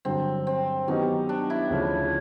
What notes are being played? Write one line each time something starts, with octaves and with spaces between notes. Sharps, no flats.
G2 D3 F#3 C4
C4
D#3 F#3 B3 C#4 D#4 G4
D4
E4
D2 C#3 F3